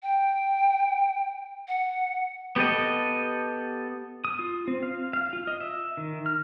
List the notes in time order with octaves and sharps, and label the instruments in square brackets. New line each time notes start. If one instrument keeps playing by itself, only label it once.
[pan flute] G5
F#5
[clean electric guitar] B3 G4 A4 D#5
[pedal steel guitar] D#6
F4
C4
F5
F5
F4
D#5
E5
D#3
F6